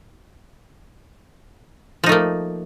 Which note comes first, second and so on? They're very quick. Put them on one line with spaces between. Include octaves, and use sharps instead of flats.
F3 D#4 A3 A#3